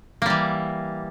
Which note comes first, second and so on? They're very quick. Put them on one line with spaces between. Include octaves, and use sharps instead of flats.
A#3 G3 E3